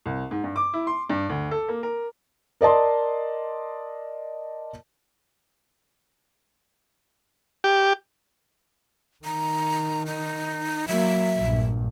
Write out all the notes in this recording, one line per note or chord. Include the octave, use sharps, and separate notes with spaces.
C2
G#2
G2
D6
E4
C6
G2
D2
A4
A#3
A#4
A#4 D5 D#5 A5 C6
G4
D#3 A#5
D#4
F#3 A#3 E5
A#1 G2